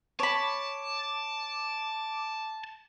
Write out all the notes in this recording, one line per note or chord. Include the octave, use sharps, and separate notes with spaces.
C#5 A5 B5 D6